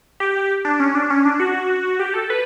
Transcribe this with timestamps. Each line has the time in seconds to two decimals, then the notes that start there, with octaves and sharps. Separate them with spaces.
0.20 G4
0.65 D4
0.80 C#4
0.95 D4
1.10 C#4
1.25 D4
1.40 F#4
1.99 G4
2.14 A4
2.30 B4